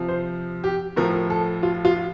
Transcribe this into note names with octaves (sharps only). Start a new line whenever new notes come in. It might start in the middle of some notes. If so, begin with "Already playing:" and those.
Already playing: C3 F3
C5
G4
A2 F3 A#4
A4
F4
F4